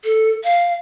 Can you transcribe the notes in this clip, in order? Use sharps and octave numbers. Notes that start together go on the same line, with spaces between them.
A4
F5